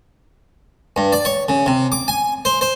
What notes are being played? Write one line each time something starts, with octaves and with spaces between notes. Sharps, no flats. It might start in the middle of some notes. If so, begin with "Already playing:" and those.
G2
D5
C#5
C#3
C3
D6
G#5
C5
C5